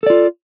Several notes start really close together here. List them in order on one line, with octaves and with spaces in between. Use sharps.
A4 D5 F4